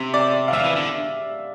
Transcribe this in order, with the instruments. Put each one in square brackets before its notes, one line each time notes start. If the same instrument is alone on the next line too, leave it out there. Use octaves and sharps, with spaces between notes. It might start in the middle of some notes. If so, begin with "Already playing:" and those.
Already playing: [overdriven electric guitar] C3 [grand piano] E5
[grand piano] D5
F5
[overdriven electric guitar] F3 [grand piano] E5
[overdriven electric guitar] E3
D3